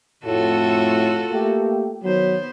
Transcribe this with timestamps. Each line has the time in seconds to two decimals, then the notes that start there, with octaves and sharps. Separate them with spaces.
0.25 F2 A2 F4 F#4 A4
1.31 A3 A#3 G4
2.04 D#3 F#3 B3 C5